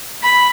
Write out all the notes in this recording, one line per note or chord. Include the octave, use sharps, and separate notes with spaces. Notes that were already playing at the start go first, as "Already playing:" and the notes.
B5